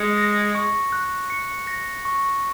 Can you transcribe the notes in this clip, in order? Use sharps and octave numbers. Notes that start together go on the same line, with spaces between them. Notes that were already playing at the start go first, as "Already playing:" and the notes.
Already playing: G#3 C#7
A#6
C#6
F#6
C#7
A#6
C#6